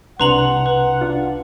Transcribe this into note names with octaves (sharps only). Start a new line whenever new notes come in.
C2 C3 D4 B4 F#5 A#5 C6 F#7
B4
D4 F4